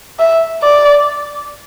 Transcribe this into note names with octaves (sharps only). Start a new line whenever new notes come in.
E5
D5